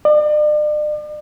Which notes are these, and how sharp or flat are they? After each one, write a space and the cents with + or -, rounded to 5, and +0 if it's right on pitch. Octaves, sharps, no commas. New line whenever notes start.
D5 +40